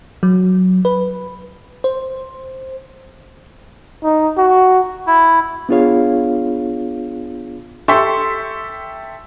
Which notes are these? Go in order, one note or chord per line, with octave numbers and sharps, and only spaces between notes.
F#3
B4
C5
D#4
F#4
E4
B3 D4 F4 G#4 C#5 F5
G4 A4 E5 C6 C#6